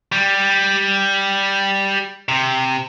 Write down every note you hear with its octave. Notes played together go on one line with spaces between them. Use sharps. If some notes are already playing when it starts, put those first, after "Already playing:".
G3
C3